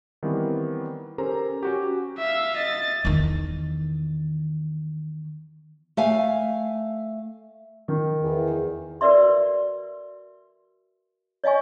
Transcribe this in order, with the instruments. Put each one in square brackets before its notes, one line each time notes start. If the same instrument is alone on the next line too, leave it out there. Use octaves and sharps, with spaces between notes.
[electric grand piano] D#3 E3 G3 B3 C4
C#4 G4 A4 A#4 C5 A#5
C#4 F#4 G4
[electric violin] E5 F5
D#5 A6
[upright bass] E2 D#3
[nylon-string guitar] A3 F5 G#5
[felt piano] D#3
[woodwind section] E2
[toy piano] F#4 A#4 B4 D5 E5 C6
C#5 D#5 F5 G#5 C#6